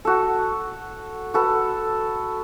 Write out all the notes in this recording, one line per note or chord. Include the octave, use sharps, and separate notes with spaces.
F#4 A4
F#4 A4 B4